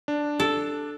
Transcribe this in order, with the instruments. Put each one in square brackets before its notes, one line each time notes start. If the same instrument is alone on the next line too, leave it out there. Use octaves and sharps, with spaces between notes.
[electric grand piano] D4
[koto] A4